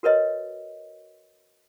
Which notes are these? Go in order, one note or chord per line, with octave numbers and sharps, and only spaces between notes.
F#4 A#4 B4 C#5 D#5